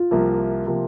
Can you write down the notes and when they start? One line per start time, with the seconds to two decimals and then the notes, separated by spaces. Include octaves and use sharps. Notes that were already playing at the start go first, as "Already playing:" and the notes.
Already playing: F4
0.11 C2 C3 F3 A#3
0.67 C3 F3 A#3